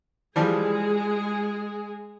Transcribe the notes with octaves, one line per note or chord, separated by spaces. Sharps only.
E3 F3 G3 G#3 G#4